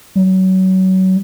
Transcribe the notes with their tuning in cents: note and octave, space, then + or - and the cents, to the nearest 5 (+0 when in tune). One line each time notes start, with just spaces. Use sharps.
F#3 +25